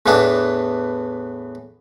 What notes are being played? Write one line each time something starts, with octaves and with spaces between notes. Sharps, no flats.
E2 A2 E3 B3 D4